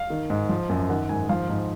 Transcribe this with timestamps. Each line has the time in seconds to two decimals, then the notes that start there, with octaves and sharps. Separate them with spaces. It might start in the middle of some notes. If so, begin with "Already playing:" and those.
Already playing: F5
0.10 D#3
0.30 G#2
0.49 F3
0.69 F#2
0.89 D#3 F#5
1.09 G#2 G#5
1.20 D#5
1.29 F3 F5
1.49 G#2